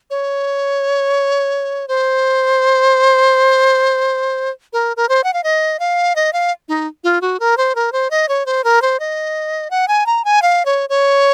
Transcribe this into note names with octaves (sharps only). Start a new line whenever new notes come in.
C#5
C5
A#4
A#4
C5
F#5
F5
D#5
F5
D#5
F5
D#4
F4
F#4
A#4
C5
A#4
C5
D#5
C#5
C5
A#4
C5
D#5
F#5
G#5
A#5
G#5
F5
C#5
C#5